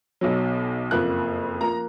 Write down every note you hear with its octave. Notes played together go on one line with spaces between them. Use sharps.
B1 B2 F#3
F#1 F2 F3 A#3 F#6
F3 A#3 A#5